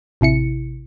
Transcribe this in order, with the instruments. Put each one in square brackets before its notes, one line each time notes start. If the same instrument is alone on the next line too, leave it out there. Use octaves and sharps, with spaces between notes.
[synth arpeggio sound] A1 C3 E4 C#7